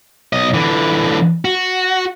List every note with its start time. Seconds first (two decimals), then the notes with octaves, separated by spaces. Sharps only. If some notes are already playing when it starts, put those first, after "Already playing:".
0.33 B1 D#5
0.54 D3 E3
1.45 F#4